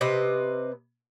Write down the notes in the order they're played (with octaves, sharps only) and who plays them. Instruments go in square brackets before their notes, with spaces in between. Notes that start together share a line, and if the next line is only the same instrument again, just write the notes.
[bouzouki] C3 B4 D#5